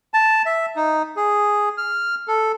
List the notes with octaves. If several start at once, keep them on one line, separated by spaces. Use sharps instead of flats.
A5
E5
D#4
G#4
F6
A4